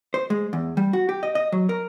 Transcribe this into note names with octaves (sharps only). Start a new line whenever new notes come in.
C5
G#3
E2
G3
F#4
G4
D#5
D#5
F#3
A#4